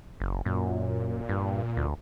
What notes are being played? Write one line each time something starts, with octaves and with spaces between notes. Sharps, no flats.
F#1
F#2 A#2
G2
D2